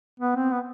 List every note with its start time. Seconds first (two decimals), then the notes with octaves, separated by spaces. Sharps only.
0.20 B3
0.36 C4
0.52 B3